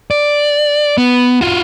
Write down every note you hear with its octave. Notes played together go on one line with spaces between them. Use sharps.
D5
B3
F4 F#4